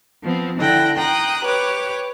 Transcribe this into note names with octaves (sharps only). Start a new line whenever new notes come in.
F3 B3 C4
D3 E4 F#5 G5 A#6
G5 A#5 C6 D#6 F#6
G4 B4 C#5 D6